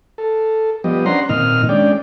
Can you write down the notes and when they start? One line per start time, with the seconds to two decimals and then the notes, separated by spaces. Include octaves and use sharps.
0.18 A4
0.84 F3 G3 B3 G4 D#5
1.06 C#4 D4 C5 F#5 A#5 C6
1.29 A#2 D#3 C4 D#5 F6
1.69 G#3 C#4 D4 D5 G5